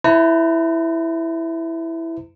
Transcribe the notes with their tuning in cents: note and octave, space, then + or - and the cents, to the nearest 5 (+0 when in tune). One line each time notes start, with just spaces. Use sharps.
E4 +0 B4 +45 A#5 -35